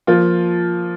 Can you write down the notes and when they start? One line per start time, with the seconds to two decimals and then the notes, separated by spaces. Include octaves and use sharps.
0.07 F3 A#3 F4